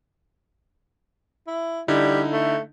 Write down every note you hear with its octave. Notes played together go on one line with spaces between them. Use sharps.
E4
D3 G3 D#4 E4
A3